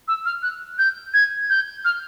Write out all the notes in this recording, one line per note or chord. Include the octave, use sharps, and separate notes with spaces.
E6
F6
F#6
G6
G#6
G6
F6